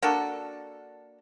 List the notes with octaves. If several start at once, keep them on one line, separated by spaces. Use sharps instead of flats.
A#3 D4 F#4 A4